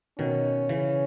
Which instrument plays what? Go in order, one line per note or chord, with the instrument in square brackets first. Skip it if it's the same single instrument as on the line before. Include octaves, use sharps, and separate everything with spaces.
[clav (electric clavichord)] B2 D#3 [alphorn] C#4
[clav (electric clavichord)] C#3 E3